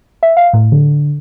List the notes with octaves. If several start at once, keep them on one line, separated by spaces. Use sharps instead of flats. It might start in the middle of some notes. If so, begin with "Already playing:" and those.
E5
F5
A2
D3